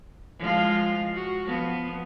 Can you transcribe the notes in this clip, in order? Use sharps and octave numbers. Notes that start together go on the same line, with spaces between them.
F3 G#3 F4
F#4
F3 B3